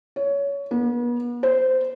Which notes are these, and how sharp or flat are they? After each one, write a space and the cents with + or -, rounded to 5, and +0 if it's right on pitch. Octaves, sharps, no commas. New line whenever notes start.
C#5 +20
B3 -40
C5 -15